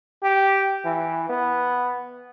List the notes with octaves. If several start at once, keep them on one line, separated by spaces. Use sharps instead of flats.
G4
E3
B3